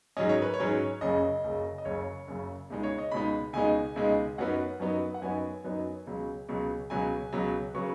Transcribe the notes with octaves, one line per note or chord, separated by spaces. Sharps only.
G#2 F#3 C#4 D#5
C#5
B4
C#5
G#2 F#3 C#4
F#1 F#2 C#3 D#5
F#1 F#2 C#3
D#5
F#1 F#2 C#3 C#5
F#1 F#2 C#3
C#2 B2 G#3 D#4
C#5
D#5
C#2 B2 G#3 D#4 B5
C#2 B2 G#3 D#4 G#5
C#2 B2 G#3 D#4
F#2 F#3 B3 D#4 F#5
F#2 F#3 B3 D#4
F#5
F#2 F#3 B3 D#4 G#5
F#2 F#3 B3 D#4
C#2 B2 F#3
C#2 B2 F#3
C#2 B2 F#3 G#5
C#2 B2 F#3
C#3 F#3 B3 C#6